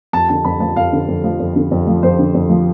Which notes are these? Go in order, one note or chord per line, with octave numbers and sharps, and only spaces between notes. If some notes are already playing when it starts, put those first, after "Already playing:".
F2 A5
D3 A5
F2 B5
F3 A5
F2 F5
D3
F2
F3
F2
D3
F2
F3
F2 C5
D3
F2
F3